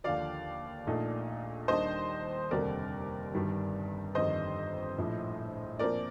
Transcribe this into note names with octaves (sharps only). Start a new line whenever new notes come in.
D#2 D3 F3 D5 F5
A#1 A#2 A3 D#4
D#2 D#3 G3 D4 C5 D#5
F1 D#2 D3 G3 C4 A#4 D5
G1 G2 D#3 G3 D4
G1 F2 D#3 G3 C5 D#5
A#1 A2 F3
A#2 F3 C4 A#4 D5